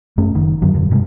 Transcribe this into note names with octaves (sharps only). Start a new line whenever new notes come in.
F#2 A3 C#4
F#1 D#3
F#2 D3 F#3
E1 F#2 D3
G2 C3 G#3